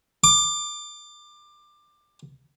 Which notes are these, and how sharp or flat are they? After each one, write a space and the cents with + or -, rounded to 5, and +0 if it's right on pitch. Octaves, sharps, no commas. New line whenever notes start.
D6 +20